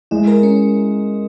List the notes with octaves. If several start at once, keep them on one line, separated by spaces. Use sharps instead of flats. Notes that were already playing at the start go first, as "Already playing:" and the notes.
G#3 E4
A#4
C#4